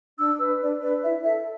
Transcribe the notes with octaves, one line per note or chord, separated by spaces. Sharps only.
D4 E6
B4
D4 D5
B4 D5
E4 E5
A4 E5